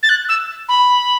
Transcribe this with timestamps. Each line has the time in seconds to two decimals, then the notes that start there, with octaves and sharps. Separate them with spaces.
0.03 A6
0.09 F#6
0.29 E6
0.68 B5